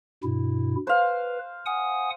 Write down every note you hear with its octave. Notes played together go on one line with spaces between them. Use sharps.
G2 B2 E4
B4 C5 F5
F#5 G#5 D#6